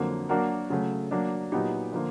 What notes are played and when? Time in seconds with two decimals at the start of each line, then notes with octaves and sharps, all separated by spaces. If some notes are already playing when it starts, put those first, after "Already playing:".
Already playing: F2 D3 F#3 A#3
0.29 F#3 A#3 D4 F#4 A#4
0.70 C#3 F#3 A3
1.11 F#3 A#3 D4
1.52 A#2 F#3 B3 D#4 G4
1.92 D3 F3 A#3